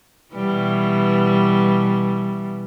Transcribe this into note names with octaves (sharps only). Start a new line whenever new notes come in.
B2 E3 G3